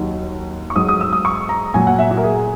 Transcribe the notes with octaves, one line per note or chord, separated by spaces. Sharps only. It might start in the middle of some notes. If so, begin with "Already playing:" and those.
Already playing: D#2 D#3 F#3
C#6
G#2 F#3 D#6
D#6
E6
D#6
C#6
A#5
A#2 F#3 G#5
F#5
E5
F#4
A#4
G#4